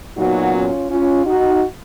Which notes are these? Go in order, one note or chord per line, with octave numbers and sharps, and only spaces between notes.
A#2 F#3 B3 D#4 F#4
C#4 F4
C#4 F4
D#4 F#4